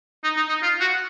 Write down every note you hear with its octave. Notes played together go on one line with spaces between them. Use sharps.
D#4
D#4
D#4
F4
F#4